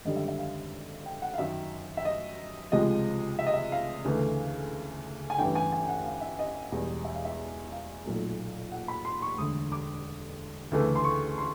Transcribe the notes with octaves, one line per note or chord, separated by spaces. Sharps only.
G#1 F#2 D3 G3 D#5
E5
E5
F5
G5
F#5
F5
F#2 D#3 F#3 E5
E5
D#5
C#2 C3 F3 G#3 D#5
E5
D#5
E5
F5
D2 C#3 E3 A3
G#5
A1 G2 E3 G5
G#5
G#5
F#5
F5
E5
D#5
E1 E2 B2 G3
E5
F5
E5
F5
B1 A#2 F#3 A3
F#5
B5
C6
C#6
E1 D2 D3 D#6
D6
D2 C#3 E3 A3
C6
C#6
C6